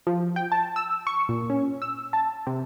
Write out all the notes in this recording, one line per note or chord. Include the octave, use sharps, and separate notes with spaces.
F3
G5
A5
E6
C#6
A#2
C#4
E6
A5
C3